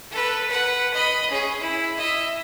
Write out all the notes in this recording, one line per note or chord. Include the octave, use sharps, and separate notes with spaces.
A4 B4
B4 F#5
D#5 B5
C#4 G#4
E4
D#5 E5